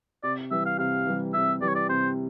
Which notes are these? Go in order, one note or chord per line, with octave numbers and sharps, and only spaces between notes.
C3 D5
E3 G3 E5
F5
C3 F5
E3 G3
C3 E5
E3 G3 D5
C#5
D5
C3 C5